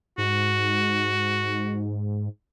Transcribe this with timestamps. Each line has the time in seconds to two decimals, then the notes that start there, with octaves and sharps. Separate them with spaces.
0.18 G#2 F#4